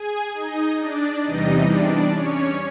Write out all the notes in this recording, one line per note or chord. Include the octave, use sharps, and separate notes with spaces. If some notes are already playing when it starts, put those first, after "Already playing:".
Already playing: G#4 G#5
D#4 D#5
D4 D5
E2 C3 E3 G3 D#4 D#5
D4 D5
C#4 C#5